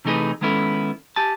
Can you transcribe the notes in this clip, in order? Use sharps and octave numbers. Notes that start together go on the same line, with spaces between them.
C3 E3 A3 D#4 G#4 B4
D#3 G#3 B3 C#4 E4 A4
G4 G#5 A5